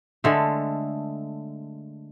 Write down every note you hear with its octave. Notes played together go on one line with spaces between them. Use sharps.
D3 G#3 A3